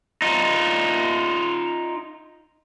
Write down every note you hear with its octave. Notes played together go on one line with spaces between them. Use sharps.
D#4 F4